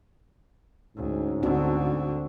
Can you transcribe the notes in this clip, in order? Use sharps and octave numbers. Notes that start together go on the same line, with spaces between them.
D2 G#2 C#4
D2 D3 C4 D4 F#4